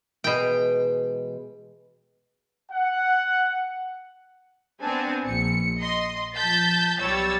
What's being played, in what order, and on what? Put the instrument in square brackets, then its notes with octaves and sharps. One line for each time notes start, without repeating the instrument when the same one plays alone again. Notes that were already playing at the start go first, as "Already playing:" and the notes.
[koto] B2 G5 [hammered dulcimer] E3 G#3
[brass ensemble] F#5
[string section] B3 C4 D4 G#5
A#1 C#7
D#5 C6
F3 A5 G6 A6 B6
B1 G3 C#5 E6 A6